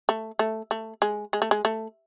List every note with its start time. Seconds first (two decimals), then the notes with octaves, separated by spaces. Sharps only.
0.09 A3
0.39 A3
0.71 A3
1.02 G#3
1.33 G#3
1.42 A3
1.51 G#3
1.65 A3